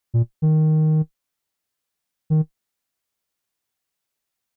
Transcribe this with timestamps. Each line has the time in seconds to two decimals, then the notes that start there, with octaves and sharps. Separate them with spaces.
0.14 A#2
0.42 D#3
2.30 D#3